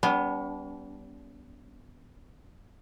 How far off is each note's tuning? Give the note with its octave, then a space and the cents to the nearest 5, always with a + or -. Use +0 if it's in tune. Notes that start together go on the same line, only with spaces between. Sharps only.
G3 +0 B3 +0 D4 -45